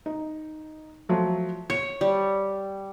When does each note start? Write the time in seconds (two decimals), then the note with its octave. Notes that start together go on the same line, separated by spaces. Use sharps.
0.06 D#4
1.09 F3 F#3 A3
1.70 C#5 C#7
2.01 G3